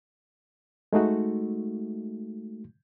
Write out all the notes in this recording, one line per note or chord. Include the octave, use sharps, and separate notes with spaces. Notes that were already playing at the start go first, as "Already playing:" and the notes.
G#3 A3 D#4 F#4